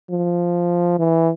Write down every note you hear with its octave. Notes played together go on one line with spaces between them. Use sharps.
F3
E3